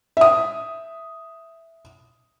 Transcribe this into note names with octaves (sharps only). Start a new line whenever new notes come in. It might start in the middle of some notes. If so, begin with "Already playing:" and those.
E5 D#6